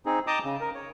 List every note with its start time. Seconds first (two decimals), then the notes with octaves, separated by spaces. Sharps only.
0.06 C4 D#4 G#4
0.27 D#5 G5 A5 A#5 D6 D#6
0.44 C#3
0.61 A#4
0.75 C#5